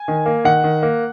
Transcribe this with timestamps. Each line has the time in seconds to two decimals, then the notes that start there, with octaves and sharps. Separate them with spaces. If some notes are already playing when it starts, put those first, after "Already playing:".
Already playing: G#5
0.08 D#3
0.26 A#3
0.45 D#3 F#5
0.64 D#3
0.83 A#3